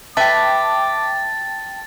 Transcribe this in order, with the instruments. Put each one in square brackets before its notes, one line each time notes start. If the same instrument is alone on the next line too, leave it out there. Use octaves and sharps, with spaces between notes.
[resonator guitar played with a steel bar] B4 E5 [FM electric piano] G5 A5 [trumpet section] D6 [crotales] A6